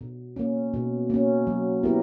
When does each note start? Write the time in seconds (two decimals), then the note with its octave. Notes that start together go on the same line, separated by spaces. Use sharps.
0.01 B2
0.36 A#3 C#4
0.74 B2
1.10 A#3 C#4
1.47 F#3
1.83 B3 E4 G4 A#4